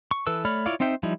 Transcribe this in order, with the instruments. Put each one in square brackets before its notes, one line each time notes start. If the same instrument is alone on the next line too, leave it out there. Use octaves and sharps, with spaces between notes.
[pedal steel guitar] C#6
E3 A4 B4 E6
A3 C#5 D5 B5 F6
E4 F4 C#5 D5 F5
C4 D#4 C5 E5 G5
F3 G3 D#4 E4